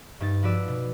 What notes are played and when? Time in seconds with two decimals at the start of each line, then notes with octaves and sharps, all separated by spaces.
0.20 G2 D#4 A6
0.43 F3 F#4 B4 D5 E6
0.68 B2